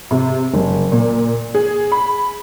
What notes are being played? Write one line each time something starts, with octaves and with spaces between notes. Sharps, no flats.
C3
F#1
A#2
G#4
B5